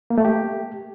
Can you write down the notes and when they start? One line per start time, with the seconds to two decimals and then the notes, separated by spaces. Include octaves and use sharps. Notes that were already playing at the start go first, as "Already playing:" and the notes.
0.10 A#3
0.18 A3
0.25 G4